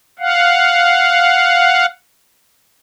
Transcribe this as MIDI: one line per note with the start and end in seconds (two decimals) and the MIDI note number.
0.19 1.86 77
0.19 1.86 78